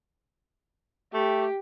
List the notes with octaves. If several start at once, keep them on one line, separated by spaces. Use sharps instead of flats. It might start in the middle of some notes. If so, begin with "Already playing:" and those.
A3 G4